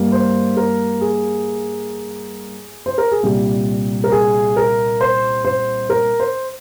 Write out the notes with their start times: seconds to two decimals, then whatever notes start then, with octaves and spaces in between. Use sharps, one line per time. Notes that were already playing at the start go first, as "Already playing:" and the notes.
Already playing: G2 G3 A#3
0.12 C5
0.57 A#4
1.01 G#4
2.86 C5
2.98 A#4
3.11 G#4
3.23 C2 A#2 G3 G4
4.04 A#4
4.12 G#4
4.56 A#4
5.01 C5
5.45 C5
5.90 A#4
6.20 C5